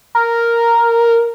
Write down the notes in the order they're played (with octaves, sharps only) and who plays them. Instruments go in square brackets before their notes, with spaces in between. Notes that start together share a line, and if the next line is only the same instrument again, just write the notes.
[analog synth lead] A#4